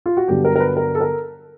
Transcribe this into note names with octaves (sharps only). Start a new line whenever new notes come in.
F4
F#4
G2 D3 F#3 B3 G4
A#4
A#4
B4
A#4
A4
A#4